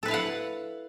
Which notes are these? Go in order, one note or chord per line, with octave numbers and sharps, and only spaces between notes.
E4 A4 B4 F5 F#5